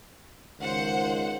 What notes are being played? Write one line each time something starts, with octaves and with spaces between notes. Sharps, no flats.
C#2 D#3 C5 F#5